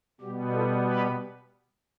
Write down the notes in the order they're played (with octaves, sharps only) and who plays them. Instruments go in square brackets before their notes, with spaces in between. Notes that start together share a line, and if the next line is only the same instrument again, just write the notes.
[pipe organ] B2 G3 B3 G4
F4 A4
G4 B4